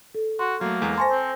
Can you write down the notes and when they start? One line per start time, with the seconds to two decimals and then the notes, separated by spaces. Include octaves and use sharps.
0.15 A4
0.39 F#4 C6
0.61 F#3 A3 A#3
0.82 E2 G#3
0.98 C5 G#5 A5 C6 C#6 A#6
1.10 C4